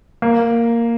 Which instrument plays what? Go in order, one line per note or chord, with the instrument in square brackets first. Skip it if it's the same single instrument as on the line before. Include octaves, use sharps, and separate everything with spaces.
[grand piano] A#3